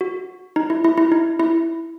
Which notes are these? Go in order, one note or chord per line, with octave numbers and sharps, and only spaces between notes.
F#4
D#4
E4
E4
E4
D#4
E4